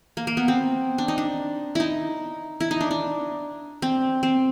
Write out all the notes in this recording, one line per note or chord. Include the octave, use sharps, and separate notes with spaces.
A#3
A#3
B3
C4
D4
D#4
D4
D#4 E4
E4
D#4
D4
D4
C4
C4